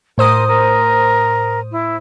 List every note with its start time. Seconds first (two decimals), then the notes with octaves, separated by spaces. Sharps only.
0.18 A2 A#4 C5 D#6
0.48 A#4
1.72 E4